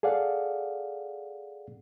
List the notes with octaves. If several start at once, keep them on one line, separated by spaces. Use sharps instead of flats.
G#4 A4 D5 F5 F#5